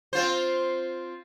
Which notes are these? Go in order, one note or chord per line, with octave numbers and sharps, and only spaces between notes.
C4 F4 C5